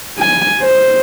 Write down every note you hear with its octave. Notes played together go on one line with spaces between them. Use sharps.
G#5
C5